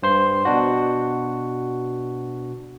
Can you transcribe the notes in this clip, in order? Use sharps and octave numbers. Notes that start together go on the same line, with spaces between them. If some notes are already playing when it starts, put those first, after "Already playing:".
G2 C5 C6
B2 D4 F#4